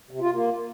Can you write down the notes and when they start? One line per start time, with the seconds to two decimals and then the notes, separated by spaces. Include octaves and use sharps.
0.11 C3
0.21 F4
0.32 A#3